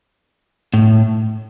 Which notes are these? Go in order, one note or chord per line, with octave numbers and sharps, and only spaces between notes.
A2